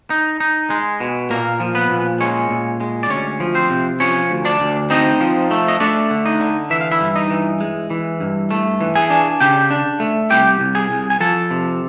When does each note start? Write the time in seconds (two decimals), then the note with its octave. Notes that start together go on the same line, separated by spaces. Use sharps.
0.10 D#4
0.40 D#4
0.70 G#3
1.00 B2
1.30 A#2 A#3 A#4
1.60 F3
1.75 B3 B4
1.90 A#2
2.20 G#3 C#4 C#5
2.50 A#2
2.81 G#3
3.03 D5
3.10 D2 C#4 C#5
3.40 F3
3.55 C4 C5
3.70 C3
4.00 F3 C#4 C#5
4.31 D2
4.45 D4 D5
4.60 D2
4.90 C4 D#4 D#5
5.21 F3
5.51 A3
5.68 D#5
5.80 A3 D4 D5
6.10 D3
6.25 D#4 D#5
6.40 D3
6.70 E3 E5
6.81 F5
6.92 E4 E5
7.01 G2
7.15 D#4 D#5
7.30 E3
7.60 G#3
7.90 E3
8.20 G2
8.51 A3
8.81 E3
8.95 G#4 G#5
9.10 D4
9.40 C#3 G4 G5
9.70 D4
10.00 A3
10.30 C2 G4 G5
10.60 C2
10.75 G#4 G#5
10.90 C2
11.10 G#5
11.20 F3 A4 A5
11.51 C3